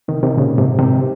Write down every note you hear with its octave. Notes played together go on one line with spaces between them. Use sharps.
C3 D#3
C3 D#3
A#2 C#3
G#2 C3
C3 D#3